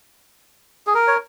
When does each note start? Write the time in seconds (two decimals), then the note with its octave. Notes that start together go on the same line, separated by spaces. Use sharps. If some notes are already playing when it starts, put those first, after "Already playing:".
0.87 G#4
0.94 A#4
1.08 C#5